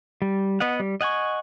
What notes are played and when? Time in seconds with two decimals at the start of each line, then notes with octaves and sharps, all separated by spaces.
0.22 G3
0.60 B3 D#5 F#5
0.80 G3
1.01 D#5 F#5 G#5 C#6